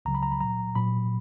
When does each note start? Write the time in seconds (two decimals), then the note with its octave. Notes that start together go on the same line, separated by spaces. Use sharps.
0.05 C#2 C#3 F#3 A#5
0.15 B5
0.23 A#5
0.32 B5
0.40 A#2 F#3 A#5
0.75 A#2 F#3 B5